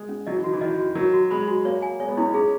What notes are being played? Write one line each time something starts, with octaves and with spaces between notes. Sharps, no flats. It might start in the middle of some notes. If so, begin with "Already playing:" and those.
Already playing: G#3
C#4
F#3 D#5
E3
D#3 F#4
E3
D#3 D#5
F#4
F#3 A#4
F#4
G#3 B5
F#4
A#3 C#5
G#5
G#3 C#5
B3
C#4 E4
D#4
C#4 G#4